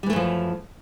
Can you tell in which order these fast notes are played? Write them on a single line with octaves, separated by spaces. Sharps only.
G3 E3 A3 F#2 F3